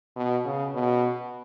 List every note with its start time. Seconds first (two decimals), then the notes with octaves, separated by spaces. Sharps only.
0.16 B2
0.45 C#3
0.74 B2